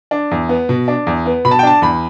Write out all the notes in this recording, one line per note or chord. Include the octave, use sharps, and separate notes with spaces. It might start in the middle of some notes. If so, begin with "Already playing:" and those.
D4
E2
B3
B2
D4
E2
B3
B2 B5
A5
G5
D4 A5
E2 B5